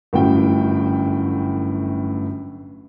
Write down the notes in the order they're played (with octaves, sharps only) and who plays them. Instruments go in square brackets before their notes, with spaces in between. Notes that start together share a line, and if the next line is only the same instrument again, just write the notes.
[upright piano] G1 F#2 A2 F#4 G5